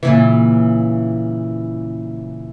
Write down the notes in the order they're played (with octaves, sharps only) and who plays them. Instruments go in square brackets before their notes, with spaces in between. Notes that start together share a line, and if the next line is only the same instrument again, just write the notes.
[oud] A#2 C#3 E3